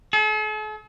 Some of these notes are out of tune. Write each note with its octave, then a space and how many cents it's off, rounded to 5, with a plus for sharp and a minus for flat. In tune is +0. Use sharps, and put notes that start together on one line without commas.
A4 -45